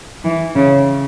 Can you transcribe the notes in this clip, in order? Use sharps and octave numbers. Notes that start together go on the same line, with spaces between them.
E3
C#3